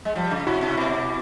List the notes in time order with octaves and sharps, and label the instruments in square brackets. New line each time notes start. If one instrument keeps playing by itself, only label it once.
[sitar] G#3
F3 G3
C#3
[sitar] C3 [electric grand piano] E4 F#4
[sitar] C3
B2